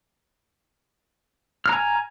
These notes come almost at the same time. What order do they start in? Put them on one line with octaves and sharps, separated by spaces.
F6 A#5 G#5